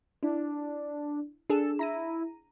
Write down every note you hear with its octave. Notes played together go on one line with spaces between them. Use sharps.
D4 E4
D4 G#4 A4 E7
E4 A#5 A#6 D#7